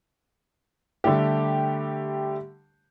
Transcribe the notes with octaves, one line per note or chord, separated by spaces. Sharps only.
D3 G3 A3 G4